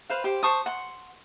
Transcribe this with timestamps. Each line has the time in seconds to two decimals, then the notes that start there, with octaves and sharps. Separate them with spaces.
0.10 B4 C5 F5
0.24 G4 C5
0.43 C5 A5 C#6 D#6
0.66 F#5 C6